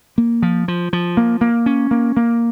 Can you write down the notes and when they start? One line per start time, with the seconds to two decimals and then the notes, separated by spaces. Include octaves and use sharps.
0.18 A#3
0.42 F3
0.68 F3
0.93 F3
1.17 A#3
1.41 A#3
1.66 C#4
1.91 A#3
2.17 A#3